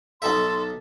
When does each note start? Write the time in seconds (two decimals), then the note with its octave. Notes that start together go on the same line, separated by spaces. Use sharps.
0.22 B1 D#4 A4 E5 C6